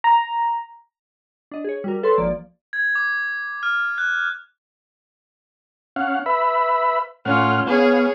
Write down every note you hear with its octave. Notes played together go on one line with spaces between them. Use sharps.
A#5
D4 D#5
G#4 C#5
G3 F#4 A#4
A4 B4 C#5 C6
G#1 F3 A#3 D5
G#6
D6
F6
F#6
C#4 F5 F#5
B4 E5 B5
A2 C#4 F4 F#5 F6
B3 G#4 C#5 F5